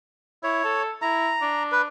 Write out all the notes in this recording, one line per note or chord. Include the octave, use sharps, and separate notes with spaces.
E4 C#5
A4
E4 A#5
D4
B4